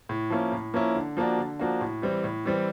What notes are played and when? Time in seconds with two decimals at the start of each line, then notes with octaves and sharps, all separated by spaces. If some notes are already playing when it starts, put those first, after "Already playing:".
0.09 A2
0.30 F3 A#3 C#4 E4
0.52 A2
0.74 F3 A#3 C#4 E4
0.96 D3
1.17 F3 A#3 D4 F#4
1.38 D3
1.60 F3 A#3 D4 F#4
1.81 A2
2.02 E3 G3 C4
2.24 A2
2.45 E3 G3 C4